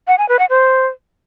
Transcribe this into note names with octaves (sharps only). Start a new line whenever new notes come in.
F#5
G#5
B4
F#5
C5